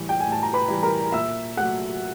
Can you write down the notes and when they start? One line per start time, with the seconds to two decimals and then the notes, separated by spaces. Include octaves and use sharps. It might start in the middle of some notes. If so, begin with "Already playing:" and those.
Already playing: A2 E3 G3
0.09 G5
0.20 A2 G#5
0.32 A5
0.43 A#5
0.53 B4 B5
0.68 E3 G3
0.83 A#4 A#5
1.12 A#2 E5 E6
1.57 F#3 A3 F#5 F#6